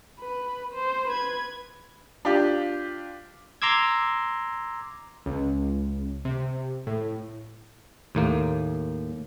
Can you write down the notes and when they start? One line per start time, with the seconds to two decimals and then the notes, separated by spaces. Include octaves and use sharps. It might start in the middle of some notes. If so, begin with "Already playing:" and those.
0.20 B4
0.74 C5
1.08 B4 G#6
2.25 D4 F4 G4
3.62 A#5 C6 D6 E6 G#6
5.26 C#2
6.25 C3
6.87 A2
8.15 D#2 A2 A#3